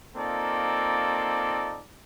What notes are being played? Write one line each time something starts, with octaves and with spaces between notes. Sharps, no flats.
A#3 C4 D#4 F4 A4 D5